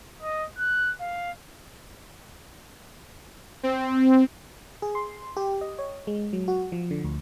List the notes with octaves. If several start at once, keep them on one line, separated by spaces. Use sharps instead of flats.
D#5
F#6
F5
C4
G#4
C6
G4
D#5
C#5
G#3
F#3
F#4
F3
D3
D2